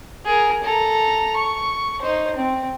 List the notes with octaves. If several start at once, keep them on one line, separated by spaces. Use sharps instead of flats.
G#4 A#4
A4 A#5
C#6
D#4 C5
C4